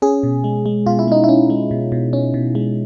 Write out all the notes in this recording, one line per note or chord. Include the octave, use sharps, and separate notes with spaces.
C#4 G#4
B2
G#3
G#3
B2 F4
E4
G#3 D#4
C#4 E4
G#3
B2
B2
C#4
B2
G#3